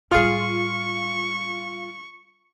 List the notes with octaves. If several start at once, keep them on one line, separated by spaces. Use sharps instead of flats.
A2 G3 F4 G#4 C#6 F6